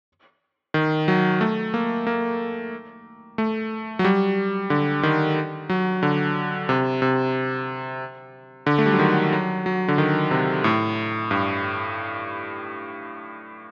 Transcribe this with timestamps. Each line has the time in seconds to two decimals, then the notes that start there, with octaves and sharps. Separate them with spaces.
0.74 D#3
1.08 F#3
1.41 A3
1.74 A#3
2.07 A#3
3.38 A3
3.99 F#3
4.04 G3
4.70 D3
5.03 D#3
5.69 F#3
6.03 D3
6.69 C3
7.02 C3
8.66 D3
8.78 A3
8.86 G3
8.92 F#3
8.99 D#3
9.33 F#3
9.66 F#3
9.88 D3
9.98 D#3
10.31 C3
10.64 A2
11.31 G2